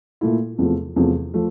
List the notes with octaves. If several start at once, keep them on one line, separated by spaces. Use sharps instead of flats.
A#2 A3 E4
E2 C3 F3 A3
E2 C3 F3 A3
F3 A3